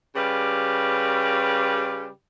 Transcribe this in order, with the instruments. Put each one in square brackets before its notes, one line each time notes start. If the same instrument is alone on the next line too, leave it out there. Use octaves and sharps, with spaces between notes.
[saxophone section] C#3 G3 F4 G4 B4